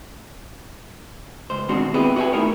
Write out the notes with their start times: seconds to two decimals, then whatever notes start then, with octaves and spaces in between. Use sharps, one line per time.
1.50 C#2 C5
1.69 B2 D#3 G#3 C4 D4 F#4
1.94 B3 C4 E4 G4 G#4 B4
2.16 F#4 B4 D#5 G5 G#5
2.33 A3 B3 D#4 E4 A#4 C#5